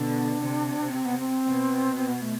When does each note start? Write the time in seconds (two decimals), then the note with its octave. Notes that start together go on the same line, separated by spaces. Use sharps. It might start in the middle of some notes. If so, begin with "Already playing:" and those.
Already playing: B2 D3 D4
0.41 C3
0.92 C4
1.05 B3
1.19 C4
1.45 B2
1.96 C4
2.08 B3
2.21 A3